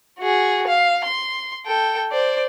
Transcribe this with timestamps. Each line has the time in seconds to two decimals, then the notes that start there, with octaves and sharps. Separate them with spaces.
0.19 F#4 G#4
0.67 F5
1.04 C6
1.66 A4 G5
2.12 C5 D5